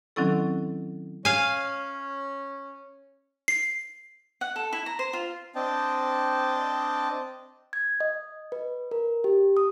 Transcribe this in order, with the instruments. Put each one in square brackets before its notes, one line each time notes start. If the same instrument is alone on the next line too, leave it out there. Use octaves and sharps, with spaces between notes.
[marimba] D#3 F#3 C4 C#4 E4 A4
[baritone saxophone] C#4 [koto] F5 G#5
[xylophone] C7
[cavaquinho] F#5
A4
E4
A#5
C5
F4
[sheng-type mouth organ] C4 D4 D#5 G5 A5
[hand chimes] G#6
D#5
B4
A#4
G4
D#6